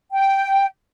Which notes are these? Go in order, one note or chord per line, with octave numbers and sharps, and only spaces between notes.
G5